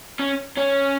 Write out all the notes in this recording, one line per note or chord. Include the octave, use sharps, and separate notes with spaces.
C#4
C#4